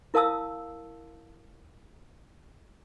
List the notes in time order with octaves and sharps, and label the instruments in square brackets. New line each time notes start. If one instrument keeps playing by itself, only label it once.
[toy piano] E4 A#4 F5 A5 D#6 E6